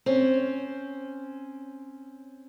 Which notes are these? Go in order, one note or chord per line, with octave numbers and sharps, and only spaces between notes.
C4 C#4